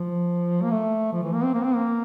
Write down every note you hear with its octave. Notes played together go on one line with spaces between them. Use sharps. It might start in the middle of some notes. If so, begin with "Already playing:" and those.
Already playing: F3
A#3
A3
F3
E3
A#3
C4
A#3
C4
A#3